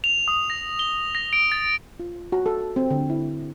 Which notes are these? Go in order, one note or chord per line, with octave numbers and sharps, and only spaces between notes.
F7
D#6
A#6
G7
A#6
D7
A6
F4
F#4
A4
C4
D3
E4